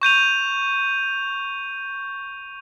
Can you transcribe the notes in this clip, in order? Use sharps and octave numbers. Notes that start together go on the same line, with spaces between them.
C#6 G6 D#7 F7